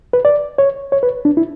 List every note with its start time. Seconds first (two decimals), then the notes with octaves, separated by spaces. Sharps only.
0.13 B4
0.25 D5
0.58 C#5
0.92 C#5
1.03 B4
1.25 D4
1.37 E4